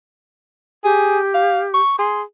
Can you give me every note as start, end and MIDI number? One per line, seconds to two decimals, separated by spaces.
0.84 1.80 67
0.84 1.19 68
1.34 1.61 77
1.74 1.95 85
1.99 2.24 68
1.99 2.20 84